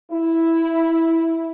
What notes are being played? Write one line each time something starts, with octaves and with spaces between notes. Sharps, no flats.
E4